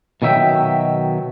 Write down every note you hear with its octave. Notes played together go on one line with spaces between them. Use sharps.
B2 D#3 F#3 E5 G5